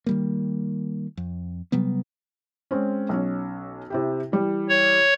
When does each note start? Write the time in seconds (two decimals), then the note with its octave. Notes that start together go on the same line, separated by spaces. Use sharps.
0.06 D#3 G3 A#3
1.17 F2
1.72 C3 F#3 G3 B3
2.71 G#3 C4 C#4
3.09 B1 C#4
3.90 C3 E4 G4
4.32 E3 G3
4.69 C#5